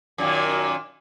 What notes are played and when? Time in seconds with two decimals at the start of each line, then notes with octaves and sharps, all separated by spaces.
0.18 F#2 A#2 D#3